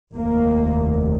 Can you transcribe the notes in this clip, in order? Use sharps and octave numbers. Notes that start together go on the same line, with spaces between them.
F1 D#2 A#3